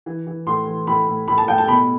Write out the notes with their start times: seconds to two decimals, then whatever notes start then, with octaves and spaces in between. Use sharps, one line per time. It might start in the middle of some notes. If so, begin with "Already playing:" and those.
0.06 E3
0.27 E3
0.47 A2 C6
0.67 E3
0.87 A2 B5
1.07 A2
1.28 A2 B5
1.38 A5
1.48 A2 G5
1.58 A5
1.68 B2 B5